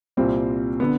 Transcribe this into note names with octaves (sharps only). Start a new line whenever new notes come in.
C2 A#2 G3 C4
D3 B3